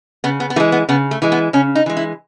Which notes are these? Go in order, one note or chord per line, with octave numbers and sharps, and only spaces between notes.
C#3 B3
B3
B3
E3 G#3 A3
B3
C#3 B3
A3
E3 G#3
B3
C#3 C#4
D#4
E3 G#3
E4